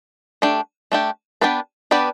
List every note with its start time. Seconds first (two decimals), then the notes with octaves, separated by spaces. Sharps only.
0.42 A3 D4 G4
0.92 A3 D4 G4
1.41 B3 D4 G4 B4 D5
1.91 B3 D4 G4 B4 D5